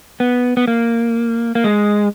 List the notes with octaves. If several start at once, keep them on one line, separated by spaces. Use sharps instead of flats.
B3
B3
A#3
A#3
G#3